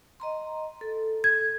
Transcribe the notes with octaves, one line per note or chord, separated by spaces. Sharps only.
D#5 A#5 C6
A4
G#6